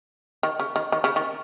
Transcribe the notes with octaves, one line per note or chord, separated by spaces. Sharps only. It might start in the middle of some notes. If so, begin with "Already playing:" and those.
D#3
C#3
D#3
D#3
C#3
D#3